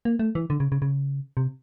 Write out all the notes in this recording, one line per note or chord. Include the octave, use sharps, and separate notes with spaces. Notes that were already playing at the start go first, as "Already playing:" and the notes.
A#3
A3
E3
D3
C#3
C#3
C#3
C3